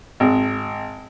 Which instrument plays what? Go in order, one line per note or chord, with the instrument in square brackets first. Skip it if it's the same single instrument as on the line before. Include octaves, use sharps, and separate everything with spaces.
[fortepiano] G#1